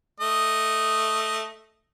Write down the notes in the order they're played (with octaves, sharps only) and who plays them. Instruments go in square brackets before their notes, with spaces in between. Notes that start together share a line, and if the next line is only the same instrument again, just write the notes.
[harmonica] A3 D#5